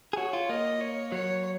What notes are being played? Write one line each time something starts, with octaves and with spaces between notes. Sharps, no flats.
G#4
F#4 C#5
F4
A#3 D#5
C#5
F#3 C#5